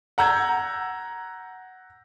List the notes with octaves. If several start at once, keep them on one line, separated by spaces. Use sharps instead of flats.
F#5 A#5 E6 G6 G#6